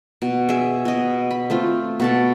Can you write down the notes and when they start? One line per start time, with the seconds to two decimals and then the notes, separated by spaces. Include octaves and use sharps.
0.22 B2
0.49 G#4 E5
0.85 B2 D#5
1.31 B5
1.50 A3 C4 F4
2.00 B2 A4 A5